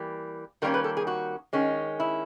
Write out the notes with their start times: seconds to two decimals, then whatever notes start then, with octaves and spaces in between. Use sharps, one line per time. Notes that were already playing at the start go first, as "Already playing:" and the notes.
Already playing: E3 G3 A#3
0.62 D#3 G3 A#3 C#4 A#4
0.74 B4
0.84 A4
0.97 G#4
1.07 F#4
1.53 D#3 G#3 C#4
2.00 E4